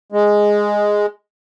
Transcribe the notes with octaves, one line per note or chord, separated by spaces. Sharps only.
G#3